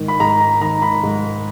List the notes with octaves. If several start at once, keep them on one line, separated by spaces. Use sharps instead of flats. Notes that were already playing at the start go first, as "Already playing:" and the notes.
Already playing: G#2 D#3
B5
G#2 A#5
A#5
D#3 A#5
B5
G#2